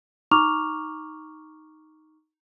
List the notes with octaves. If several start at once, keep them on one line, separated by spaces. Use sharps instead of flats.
D#4 A#5 C#6 D6 F6 F7